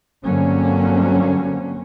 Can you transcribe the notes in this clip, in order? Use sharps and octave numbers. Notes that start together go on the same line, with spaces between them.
G2 D3 F#3 A#3 C4 C#4